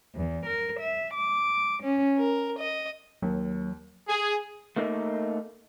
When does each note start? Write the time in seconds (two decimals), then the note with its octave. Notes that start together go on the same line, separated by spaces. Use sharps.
0.14 E2
0.45 A#4
0.79 E5
1.13 D6
1.82 C#4
2.17 A#4
2.58 D#5
3.22 D#2 F#3
4.09 G#4
4.76 A3 A#3 D#4